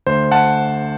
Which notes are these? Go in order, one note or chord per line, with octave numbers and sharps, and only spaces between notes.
D2 C5
F#5 A5